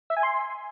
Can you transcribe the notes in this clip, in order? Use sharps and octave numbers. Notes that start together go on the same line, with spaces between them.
E5
G#5
C6